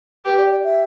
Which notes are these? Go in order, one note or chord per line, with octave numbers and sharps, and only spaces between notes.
G4 B4
D5
D5
E5